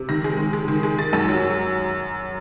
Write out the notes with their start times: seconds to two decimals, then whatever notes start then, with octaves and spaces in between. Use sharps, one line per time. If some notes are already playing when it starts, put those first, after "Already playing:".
Already playing: C3
0.09 D#3 A#6
0.24 G#3
0.38 D#3
0.53 G#3
0.68 D#3
0.83 G#3
0.98 G#3 A6
1.13 F#2
1.28 F#3